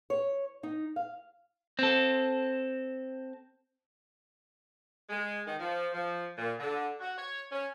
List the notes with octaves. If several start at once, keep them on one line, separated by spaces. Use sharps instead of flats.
C#5
D#4
F5
C4 A4
G#3
D#3
F3
F3
A#2
D3
F#4
C#5
C#4